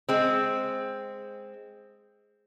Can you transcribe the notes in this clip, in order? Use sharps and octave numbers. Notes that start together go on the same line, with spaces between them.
G#3 C4